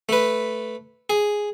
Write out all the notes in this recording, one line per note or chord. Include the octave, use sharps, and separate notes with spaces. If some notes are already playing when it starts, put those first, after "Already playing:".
A3 B4
G#4